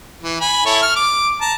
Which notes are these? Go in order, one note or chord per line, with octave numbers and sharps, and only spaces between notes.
E3
G#5 B5
E4 A4 C#5
F6
D6
A5 A#5